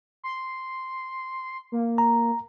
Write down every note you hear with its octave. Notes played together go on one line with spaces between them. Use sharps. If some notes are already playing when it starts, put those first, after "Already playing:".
C6
A#3
A#5